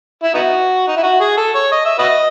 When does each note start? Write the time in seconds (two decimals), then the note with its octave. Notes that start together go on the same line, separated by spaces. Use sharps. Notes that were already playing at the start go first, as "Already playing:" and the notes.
0.23 E4
0.34 B3 D#4 F#4
0.88 D#4
0.96 E4
1.03 F#4
1.20 G#4
1.37 A4
1.55 C#5
1.72 D#5
1.85 E5
1.99 F#4 B4 D#5